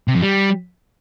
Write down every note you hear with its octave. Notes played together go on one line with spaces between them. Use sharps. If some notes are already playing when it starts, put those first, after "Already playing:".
C3
F2
G3